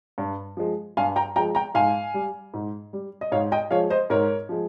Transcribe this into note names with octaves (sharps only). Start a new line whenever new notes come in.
G2
F3 G#3
G2 F5 G#5
G5 A#5
F3 G#3 G5 A#5
G5 A#5
G#2 F5 G#5
G3
G#2
G3
D#5
G#2 C#5 F5
D#5 G5
F3 G#3 C#5 F5
C5 D#5
G#2 A#4 C#5
F3 G#3